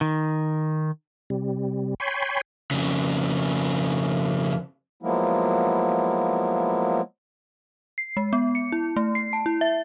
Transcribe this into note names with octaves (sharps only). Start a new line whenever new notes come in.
D#3
C3 G3
C#5 G5 G#5 B5 C6
F2 C#3
F3 F#3 G#3 A#3 B3 E4
C7
G#3
B3
C#7
E4
A3
C7
A5
E4
E5